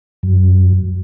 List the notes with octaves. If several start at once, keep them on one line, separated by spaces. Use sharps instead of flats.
F#2